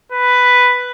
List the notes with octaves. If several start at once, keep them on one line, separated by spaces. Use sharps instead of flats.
B4